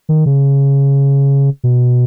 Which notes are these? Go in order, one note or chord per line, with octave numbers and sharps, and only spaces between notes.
D#3
C#3
B2